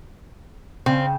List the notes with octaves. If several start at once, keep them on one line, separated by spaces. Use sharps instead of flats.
C#3 C4